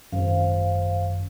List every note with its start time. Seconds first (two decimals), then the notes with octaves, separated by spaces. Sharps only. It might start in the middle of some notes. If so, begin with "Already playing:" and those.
0.12 G#1 F#2 C5 F5